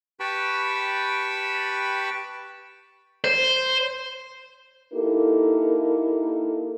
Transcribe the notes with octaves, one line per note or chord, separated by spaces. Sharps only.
G4 B4 G5 A5 B5 C#6
C5
A#3 D#4 E4 G4 A4 A#4